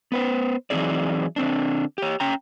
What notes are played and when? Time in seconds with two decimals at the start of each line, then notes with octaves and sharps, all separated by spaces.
0.12 B3 B4 C5
0.70 E3 F#3 C4 D#4 G#4 D5
1.36 D3 C4 D4
1.98 G4 C#5
2.20 C#4 G5 A#5